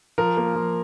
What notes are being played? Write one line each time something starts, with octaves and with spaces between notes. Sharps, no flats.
F3 A#4
A#3
F3